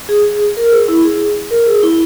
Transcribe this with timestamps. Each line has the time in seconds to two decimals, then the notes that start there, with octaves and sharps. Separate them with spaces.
0.09 G#4
0.57 A#4
0.72 G#4
0.88 E4
1.04 G#4
1.51 A#4
1.67 G#4
1.83 E4